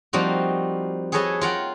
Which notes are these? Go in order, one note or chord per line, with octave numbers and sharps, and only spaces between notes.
F3 G3 A#3 C4 D#4 F#4
G#4 A4 B4 C#5 D#5 A5
F4 A#4 F#5 G5